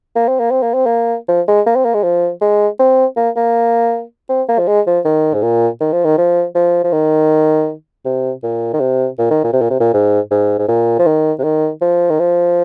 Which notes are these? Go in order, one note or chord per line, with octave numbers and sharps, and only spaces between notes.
A#3
C4
A#3
C4
A#3
C4
A#3
F3
G#3
A#3
C4
A#3
G#3
F3
G#3
C4
A#3
A#3
C4
A#3
F3
G#3
F3
D#3
G#2
A#2
D#3
F3
D#3
F3
F3
F3
D#3
C3
A#2
D#3
C3
A#2
D#3
A#2
C3
A#2
C3
A#2
G#2
G#2
G#2
A#2
F3
D#3
C3
D#3
F3
D#3
F3